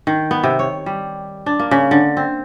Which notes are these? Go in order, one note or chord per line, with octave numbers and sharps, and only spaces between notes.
D#3
B3
C3
C#5
G3
D4
A#3
C#3
D3
C4